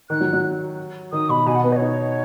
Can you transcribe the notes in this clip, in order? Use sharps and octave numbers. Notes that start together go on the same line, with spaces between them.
D#3 F#6
F#3
F#3
D#3 D#6
B2 B5
B2 G#5
F#5
B3 B4
D#5
C#5
D#4